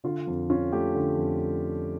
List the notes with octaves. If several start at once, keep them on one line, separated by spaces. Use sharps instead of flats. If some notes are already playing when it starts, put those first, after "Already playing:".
D3 F4
F2
C#4 F4
A3 G4
D3
F2